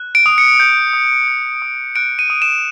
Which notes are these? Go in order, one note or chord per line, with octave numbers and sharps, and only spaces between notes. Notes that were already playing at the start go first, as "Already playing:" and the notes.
Already playing: F#6
D7
D#6
C#7
G6
D#6
G6
D#6
F#6 D7
D#7
D#6
E7